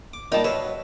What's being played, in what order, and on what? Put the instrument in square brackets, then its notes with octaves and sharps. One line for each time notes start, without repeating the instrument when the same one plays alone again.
[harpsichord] D6
[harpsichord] A#2 G3 [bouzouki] D#4 A5
[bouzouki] F#3 [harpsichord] B4 E5 F5